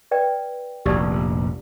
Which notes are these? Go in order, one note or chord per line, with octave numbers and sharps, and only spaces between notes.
B4 D5 G5
F1 A#1 G4 D5 A5